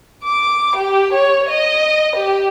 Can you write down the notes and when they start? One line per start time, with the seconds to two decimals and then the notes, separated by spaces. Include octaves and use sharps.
0.24 D6
0.76 G4
1.13 C#5
1.49 D#5
2.16 G4